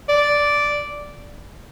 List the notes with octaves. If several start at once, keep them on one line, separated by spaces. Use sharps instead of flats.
D5